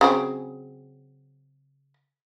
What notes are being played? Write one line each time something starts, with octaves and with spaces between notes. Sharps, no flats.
C#3 F#3 C4